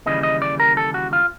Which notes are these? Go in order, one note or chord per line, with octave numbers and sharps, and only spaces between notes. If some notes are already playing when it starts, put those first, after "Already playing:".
D#2 C#3 E3 G3 D#5
D#5
D5
A#4
A4
F#4
F4